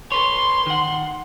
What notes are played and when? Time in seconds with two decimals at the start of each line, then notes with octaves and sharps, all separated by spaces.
0.12 A4 B4 C#5 C6
0.66 D#3 F#5